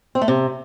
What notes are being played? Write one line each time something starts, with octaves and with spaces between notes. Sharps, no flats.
C4
A3
C3